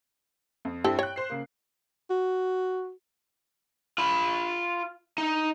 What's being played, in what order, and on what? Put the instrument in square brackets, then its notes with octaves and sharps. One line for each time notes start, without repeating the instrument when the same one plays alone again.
[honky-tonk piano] F2
[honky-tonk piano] G2 C4 E4 [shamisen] G4 A4
[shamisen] C#5 [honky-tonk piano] G5 F#6
[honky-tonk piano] C5 C7
C#3 A#3
[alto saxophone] F#4
[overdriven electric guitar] F4 B5
D#4